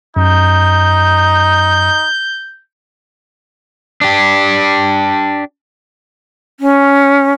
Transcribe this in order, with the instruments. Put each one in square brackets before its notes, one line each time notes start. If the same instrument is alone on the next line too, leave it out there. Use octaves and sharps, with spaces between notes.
[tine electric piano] F#2 [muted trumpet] D#4 [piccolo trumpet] G6
[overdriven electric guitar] D4 G4
[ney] C#4